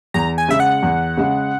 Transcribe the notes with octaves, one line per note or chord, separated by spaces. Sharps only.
E2 A#5
G#5
C#3 G#3 E5
F#5
E2
C#3 G#3